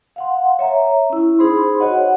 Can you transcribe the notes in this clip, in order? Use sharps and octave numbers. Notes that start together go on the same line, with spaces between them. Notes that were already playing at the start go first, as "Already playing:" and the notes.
F5 F#5 C6
C#5 E5 A#5
C#4 E4
D#4 G#4 C5 B5 C6
F#4 C#5 D#5 F#5